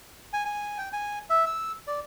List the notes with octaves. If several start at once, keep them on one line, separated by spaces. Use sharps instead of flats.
G#5
G#5
G5
G#5
E5
E6
D5